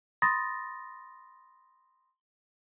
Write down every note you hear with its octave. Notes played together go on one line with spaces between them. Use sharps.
B5 C6 D#6 A6 A#6